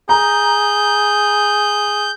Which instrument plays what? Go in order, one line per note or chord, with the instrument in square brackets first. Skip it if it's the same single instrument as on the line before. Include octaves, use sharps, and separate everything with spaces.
[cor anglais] G#4 [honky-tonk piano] A#5 [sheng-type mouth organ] G6